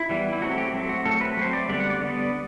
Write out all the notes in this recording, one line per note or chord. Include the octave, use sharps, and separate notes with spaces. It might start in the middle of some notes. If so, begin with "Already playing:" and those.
Already playing: E4
E3 G3 B3
E4
F#3 A3 C4 F#4
G4
F#3 A3 C4
F#4
F#3 A3 C4 A4
B4
F#3 A3 C4 C5
D5
D3 G3 B3 D5
F#5
D5
D3 G3 B3